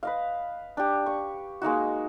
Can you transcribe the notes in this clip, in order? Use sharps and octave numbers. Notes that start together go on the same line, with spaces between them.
B4 D#5 F5
D4 G4
C#6
G#3 A#3 D#4 F#4